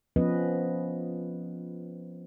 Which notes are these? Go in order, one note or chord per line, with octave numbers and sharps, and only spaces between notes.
F3 B3 C#4 B4 D#5